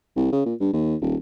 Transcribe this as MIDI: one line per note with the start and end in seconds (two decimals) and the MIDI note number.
0.16 0.29 36
0.32 0.42 49
0.45 0.54 46
0.60 0.70 43
0.73 0.95 39
1.01 1.16 27